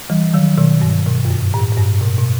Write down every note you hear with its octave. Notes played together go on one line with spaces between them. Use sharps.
E3 G3
D#3 F#3
B2 D#3
G2
B2
F#2
G2
A2
A2
G2
B2
B2